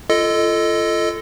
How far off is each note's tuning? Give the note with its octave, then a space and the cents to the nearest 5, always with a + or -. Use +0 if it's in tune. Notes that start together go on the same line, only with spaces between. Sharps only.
F4 -30 A4 +0 D#5 +0